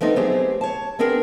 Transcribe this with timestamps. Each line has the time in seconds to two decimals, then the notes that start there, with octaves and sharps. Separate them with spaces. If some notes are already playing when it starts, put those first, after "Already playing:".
0.01 F3 G3 A3 B3 C4 D#4
0.16 F#3 A3 B3 C4 G4 G#4
0.61 C#5 A5
0.99 B3 C4 D4 G#4 A#4